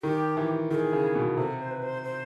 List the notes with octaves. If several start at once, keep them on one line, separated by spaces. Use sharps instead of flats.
D#3 G4
E3
D#3 G#4 A4
C#3
B2
C3 A4
C5
B4
C5
C5